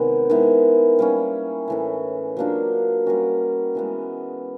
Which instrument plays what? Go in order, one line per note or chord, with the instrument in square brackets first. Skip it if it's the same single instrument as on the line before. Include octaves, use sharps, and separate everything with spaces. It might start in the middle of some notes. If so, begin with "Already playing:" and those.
Already playing: [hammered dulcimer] C3 D#3 G#3 B3
D#3 G#3 B3 E4
G3 A#3 C#4
A2 E3 A3
F#3 A#3 D4 F4
G3 A#3 C#4 F#4
E3 G#3 B3